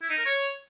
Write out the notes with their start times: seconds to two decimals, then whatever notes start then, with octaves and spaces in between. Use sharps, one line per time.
0.02 E4
0.10 D#4
0.18 A#4
0.25 C#5